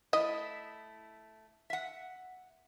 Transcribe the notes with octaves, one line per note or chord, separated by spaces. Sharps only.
A3 E4 D#5
E5 F#5